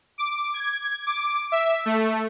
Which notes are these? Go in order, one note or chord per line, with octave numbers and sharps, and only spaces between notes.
D6
G#6
D6
E5
A3